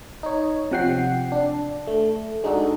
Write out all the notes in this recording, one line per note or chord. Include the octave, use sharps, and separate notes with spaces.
D#4 C#5
C3 F3 F#5 G5 C7
D4
A3
G#3 D4 D#4 F#4 A4